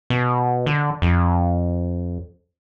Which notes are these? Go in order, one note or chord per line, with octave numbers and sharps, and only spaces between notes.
B2
D3
F2